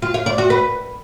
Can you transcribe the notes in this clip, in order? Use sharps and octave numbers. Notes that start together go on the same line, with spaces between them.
F4
F5
D5
F#4
B4